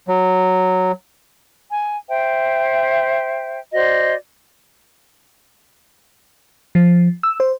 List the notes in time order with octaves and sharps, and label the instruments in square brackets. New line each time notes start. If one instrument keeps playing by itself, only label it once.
[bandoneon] F#3
[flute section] G#5
C5 E5 G5
F#4 C5 D5 D#5
[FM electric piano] F3
E6
C5